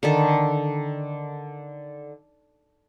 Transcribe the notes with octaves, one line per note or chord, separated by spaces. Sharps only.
D3 D#3 A4